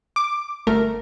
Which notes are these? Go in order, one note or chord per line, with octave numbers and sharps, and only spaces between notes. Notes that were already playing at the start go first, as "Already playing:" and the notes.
D6
G1 A3 A#4